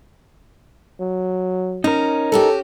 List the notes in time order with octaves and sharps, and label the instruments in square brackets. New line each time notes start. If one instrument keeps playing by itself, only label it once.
[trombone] F#3
[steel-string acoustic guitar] C#4 [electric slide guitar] D#4 A#4
[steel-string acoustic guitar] C#4 F#4 G4 [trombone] A4